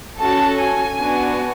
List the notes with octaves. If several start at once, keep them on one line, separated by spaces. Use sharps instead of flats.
C#4 F#4 A4 A5
G#5
B3 D4 F#4